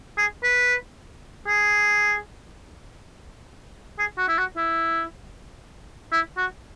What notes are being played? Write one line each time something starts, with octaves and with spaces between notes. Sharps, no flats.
G#4
B4
G#4
G#4
F#4
E4
F#4
E4
E4
F#4